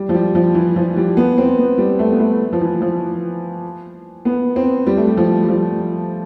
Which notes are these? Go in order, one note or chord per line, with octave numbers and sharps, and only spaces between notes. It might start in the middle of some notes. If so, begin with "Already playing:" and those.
Already playing: G3
F3
G3
F3
E3
F3
G3
B3
C4
B3
G3
A3
B3
A3
F3
E3
F3
B3
C4
G3
A3
G3
F3
G3
F3